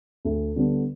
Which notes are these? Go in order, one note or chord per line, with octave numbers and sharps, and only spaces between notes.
D2
D3 G3 B3 D4